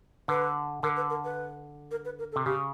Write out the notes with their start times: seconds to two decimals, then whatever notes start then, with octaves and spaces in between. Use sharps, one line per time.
0.28 D3 B4
0.83 D3 A#4
0.96 B4
1.10 A#4
1.24 B4
1.91 A#4
2.05 B4
2.19 A#4
2.32 A4
2.36 C3
2.46 C#3 G4